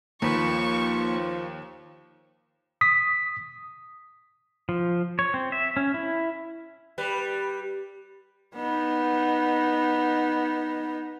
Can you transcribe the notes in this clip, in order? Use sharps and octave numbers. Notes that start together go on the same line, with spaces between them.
D#2 F3 A#3 B4 C#6
D#6 B6
F3
C#5
C4
E5
C#4
E4
G3 B4
B3 D#4